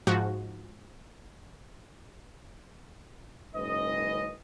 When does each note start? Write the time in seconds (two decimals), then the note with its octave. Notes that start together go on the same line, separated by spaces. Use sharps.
0.07 G#2 F3 F#4
3.55 F#1 G#2 D#3 C#4 B4 D#5